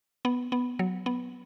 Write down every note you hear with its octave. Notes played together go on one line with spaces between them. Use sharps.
B3
B3
F#3
B3